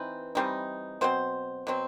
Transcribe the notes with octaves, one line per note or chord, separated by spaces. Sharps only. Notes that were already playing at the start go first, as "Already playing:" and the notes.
Already playing: E3 C4 D#4 B4
E3 G3 C4 D#4
B2 F#3 C4 C5
B2 F#3 C4